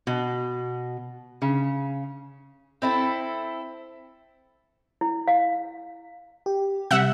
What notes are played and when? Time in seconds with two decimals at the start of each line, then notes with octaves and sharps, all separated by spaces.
0.07 B2
1.42 C#3
2.82 C4 E4 A4
5.01 E4
5.28 F5
6.46 G4
6.91 C3 G3 E5 F#5 F#6